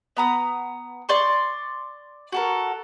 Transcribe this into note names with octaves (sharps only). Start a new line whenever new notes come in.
B3 A#5 D#6
D5 C6 C#6
F#4 A4 A#4